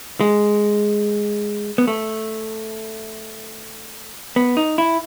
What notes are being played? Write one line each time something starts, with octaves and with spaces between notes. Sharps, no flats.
G#3
B3
A3
B3
D#4
E4